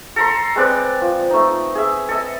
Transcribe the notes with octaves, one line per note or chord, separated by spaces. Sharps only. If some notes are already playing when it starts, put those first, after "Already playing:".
A4 A#5 C6
G#3 C4 B4 D5
F3
A3 D#4
G#4 E5
A4 D#5 E5